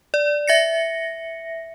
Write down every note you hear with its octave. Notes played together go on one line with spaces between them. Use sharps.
D5
E5 A#6 C#7